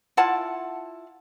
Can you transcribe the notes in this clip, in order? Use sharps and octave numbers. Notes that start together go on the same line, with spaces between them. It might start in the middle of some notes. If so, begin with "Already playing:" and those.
E4 F4 F#5 A5